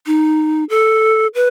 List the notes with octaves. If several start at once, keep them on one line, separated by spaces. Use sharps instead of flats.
D#4
A4
B4